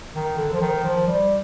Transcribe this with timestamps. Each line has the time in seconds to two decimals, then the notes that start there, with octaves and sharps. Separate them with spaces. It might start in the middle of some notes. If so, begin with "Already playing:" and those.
0.15 D#3
0.38 D3
0.53 F3
0.61 D#3
0.84 F3
1.07 G3